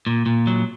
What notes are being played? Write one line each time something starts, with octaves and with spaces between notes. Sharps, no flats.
A#2
A#2
F#3